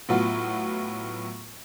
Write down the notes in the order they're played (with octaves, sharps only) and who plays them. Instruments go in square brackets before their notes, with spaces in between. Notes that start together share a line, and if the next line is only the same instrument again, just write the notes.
[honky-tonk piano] A2 F#3 B3 F4